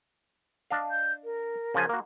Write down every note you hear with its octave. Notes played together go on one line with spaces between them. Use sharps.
D4 D#5 F5
G6
A#4
C#3 F3 G#5
A#3 F#4